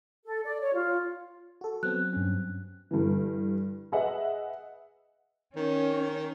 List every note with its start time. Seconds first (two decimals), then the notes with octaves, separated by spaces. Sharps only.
0.25 A4
0.44 D5
0.60 C#5
0.74 F4
1.61 F#4 A4
1.83 F#3 B3 C4 F#6
2.13 G2 C#4
2.91 G2 D3 E3
3.92 G#4 B4 D#5 E5 F#5
5.56 D#3 C#4